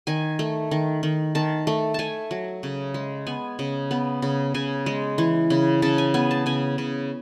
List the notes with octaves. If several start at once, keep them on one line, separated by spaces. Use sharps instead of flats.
D#3 G#5
A3
D#3
D#3
D#3 A5
A3
A3 G#5 A5
F#3
C#3
G#3
B3 G#5
C#3
B3
C#3
C#3 G#5
G#3
E3
C#3
C#3 A5
G#5
B3 G#5
A5
C#3 G#5
C#3